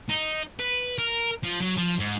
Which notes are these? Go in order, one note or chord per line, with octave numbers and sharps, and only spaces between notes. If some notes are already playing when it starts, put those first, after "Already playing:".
D#4
B4
A#4
F3
F#3
F3
G#2